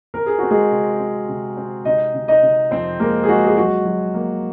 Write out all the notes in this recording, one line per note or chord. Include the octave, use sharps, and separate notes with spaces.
C4 A#4
G#4
C4 F#4
G#3 G#4
C3
C4
C3
C4
C3 D#4 D#5
C3
D#4 D#5
C3
F2 C4 C5
G#3 A#3 A#4
G#4
G#3 F#4
G#4
F#3 F#4
F#3
A#3